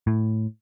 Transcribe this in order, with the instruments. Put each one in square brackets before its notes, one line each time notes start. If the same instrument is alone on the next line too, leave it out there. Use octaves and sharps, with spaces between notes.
[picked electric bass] A2